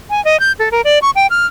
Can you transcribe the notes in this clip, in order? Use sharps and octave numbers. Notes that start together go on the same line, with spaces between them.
G#5
D#5
G6
A4
A#4
D5
C#6
G5
F6